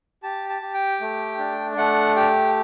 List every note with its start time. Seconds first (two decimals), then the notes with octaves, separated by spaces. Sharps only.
0.23 G4 A5
0.49 A5
0.62 G4
0.74 G5
1.01 A3
1.38 D4
1.77 A3 F#5
2.16 G4 G5